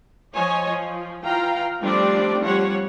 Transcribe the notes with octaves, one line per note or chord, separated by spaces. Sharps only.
F3 C#5 D#5 G#5
F3
E3 F4 F5 G5 A#5
F3 G3 A3 C4 D4 D5
F3 G3 C#5 F#5